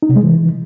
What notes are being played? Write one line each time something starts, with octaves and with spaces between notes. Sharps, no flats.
D#4
C3
G#3
E3